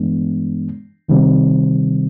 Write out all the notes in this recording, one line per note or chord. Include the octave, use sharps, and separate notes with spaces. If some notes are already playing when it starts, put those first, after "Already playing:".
Already playing: G2 E3 G#3 B3 D4
D2 C3 D#3 G3 C4